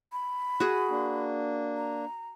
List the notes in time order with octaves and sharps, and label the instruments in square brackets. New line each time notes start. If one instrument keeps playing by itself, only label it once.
[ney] B5
[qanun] F#4 G#4
[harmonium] A#3 D4
[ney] A#5